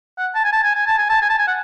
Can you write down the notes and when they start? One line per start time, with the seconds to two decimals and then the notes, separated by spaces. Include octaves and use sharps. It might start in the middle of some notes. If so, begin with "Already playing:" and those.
0.18 F#5
0.35 A5
0.44 G#5
0.53 A5
0.63 G#5
0.75 G#5
0.87 A5
0.98 G#5
1.09 A5
1.21 G#5
1.30 A5
1.38 G#5
1.47 F#5